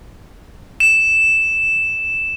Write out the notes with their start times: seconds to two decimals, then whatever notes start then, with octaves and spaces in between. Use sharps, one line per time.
0.80 E7